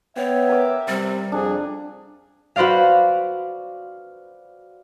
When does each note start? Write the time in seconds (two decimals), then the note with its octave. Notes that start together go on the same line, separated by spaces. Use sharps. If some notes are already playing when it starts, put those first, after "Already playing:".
0.17 B3 C#5 E5 G5
0.49 A#4 D6
0.88 C3 G3
1.32 F2 D4 G#4
2.56 F#4 B4 C5 D5 F5